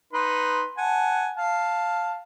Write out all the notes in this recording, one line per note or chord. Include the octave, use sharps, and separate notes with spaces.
D#4 B4 C6
F#5 G#5 A5
F5 A5